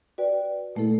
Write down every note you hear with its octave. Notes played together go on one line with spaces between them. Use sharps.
F#4 B4 D5 G5
A#2 A3 A#3 E4 A4